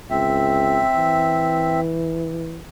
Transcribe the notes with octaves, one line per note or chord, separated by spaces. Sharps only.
C#2 C4 E5
E3